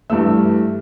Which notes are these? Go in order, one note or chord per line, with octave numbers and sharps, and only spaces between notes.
G2 E3 A3 E6